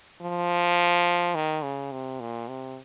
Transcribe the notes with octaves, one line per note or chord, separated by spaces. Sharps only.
F3
D#3
C#3
C3
A#2
C3